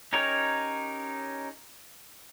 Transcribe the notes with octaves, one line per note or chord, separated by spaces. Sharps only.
C#4 D#4 G4 A#4 C#5